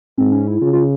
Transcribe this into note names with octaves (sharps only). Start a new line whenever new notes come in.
G#2 C4
C#4
E4
C#3 F4
F4